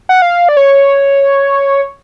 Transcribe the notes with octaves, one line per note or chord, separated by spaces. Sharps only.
F#5
F5
D5
C#5